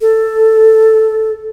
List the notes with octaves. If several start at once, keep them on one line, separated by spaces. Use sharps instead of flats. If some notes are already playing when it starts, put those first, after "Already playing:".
A4